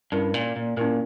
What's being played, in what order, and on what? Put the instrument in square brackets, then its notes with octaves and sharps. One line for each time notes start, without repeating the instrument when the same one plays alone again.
[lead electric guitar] G2 [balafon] C#4 E4 A#4
[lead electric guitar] A#2
A#2
[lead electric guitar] A#2 [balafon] C#4 E4 A#4